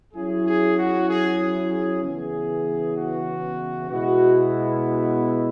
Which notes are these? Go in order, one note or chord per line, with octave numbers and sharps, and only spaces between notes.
F#3 C#4 E4 G#4
G#4
F#4
G#4
G#4
G#4
C#3 E3 B3 G#4
F#4
B2 G#3 B3 E4 F#4
F#4